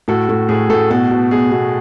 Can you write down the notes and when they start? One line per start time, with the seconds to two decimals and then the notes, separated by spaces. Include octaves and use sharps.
0.08 A2 F#4 A4
0.29 A2 F#4
0.49 A2 G#4
0.69 A2 F#4 A4
0.90 B2 F#4 A4
1.11 B2
1.31 B2 G#4
1.51 B2 F#4